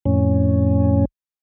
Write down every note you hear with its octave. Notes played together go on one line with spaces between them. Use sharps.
F2 A2 C#4